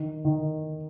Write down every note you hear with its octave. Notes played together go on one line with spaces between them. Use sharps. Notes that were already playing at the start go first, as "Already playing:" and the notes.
Already playing: D#3
D#3